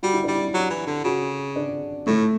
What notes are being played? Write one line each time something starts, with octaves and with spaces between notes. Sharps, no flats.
G3 F#4
E4
G3 D4
E4
F#3 G4
E3
D3
C#3 F#4
D4
A2 A3